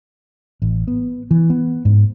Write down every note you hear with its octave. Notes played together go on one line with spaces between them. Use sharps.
A1
B3
E3
B3
G#2